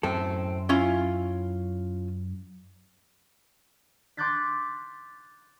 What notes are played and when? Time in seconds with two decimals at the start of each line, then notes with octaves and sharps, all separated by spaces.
0.03 F#2 A2 C4 A4
0.69 C#4 E4 F4
4.17 C6 D6 F#6 G6 A6 B6